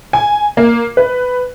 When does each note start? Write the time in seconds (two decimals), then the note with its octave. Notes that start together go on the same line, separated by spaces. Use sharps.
0.13 G#5
0.57 A#3
0.97 B4